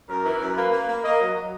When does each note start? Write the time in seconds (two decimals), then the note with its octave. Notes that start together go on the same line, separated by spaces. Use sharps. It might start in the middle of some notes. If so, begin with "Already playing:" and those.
0.09 F#2 A#4
0.25 E3
0.40 F#2
0.56 A#3 B4
0.72 A#3
0.89 A#3
1.04 A#3 D#5
1.20 F#3
1.35 F#3